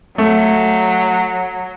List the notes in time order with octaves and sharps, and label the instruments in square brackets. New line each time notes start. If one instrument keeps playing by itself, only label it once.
[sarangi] F#3 [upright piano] A3